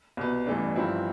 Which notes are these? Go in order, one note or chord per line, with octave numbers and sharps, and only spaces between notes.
C2 B2 B3
A1 G2 E3 A3 D4
G1 G2 F3 C4 E4